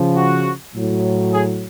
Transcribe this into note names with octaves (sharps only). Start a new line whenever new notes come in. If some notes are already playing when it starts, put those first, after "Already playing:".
Already playing: C#3 F3
F#4
A2 F#3
G#4